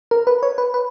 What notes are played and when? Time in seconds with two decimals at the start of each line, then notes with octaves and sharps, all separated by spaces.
0.11 A#4
0.27 B4
0.43 C#5
0.58 B4
0.74 B4